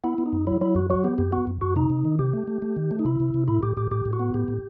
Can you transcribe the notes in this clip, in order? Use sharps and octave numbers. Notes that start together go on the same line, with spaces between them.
B3 E4
B3
D#4
F#2
F#3 E4
F#3 E4
F#2 F#4
F#3 F#4
B3 G4
F#2 G4
B3 F#4
F#2
F#2 F#4
C3 D#4
C3
D#3
C3 G4
A3
A3
A3
D#3
A3
D#4
C3 E4
C3
C3
A2 E4
A2 G4
A2 G4
A2 G4
A2
F#4
B3
A2 G4
A2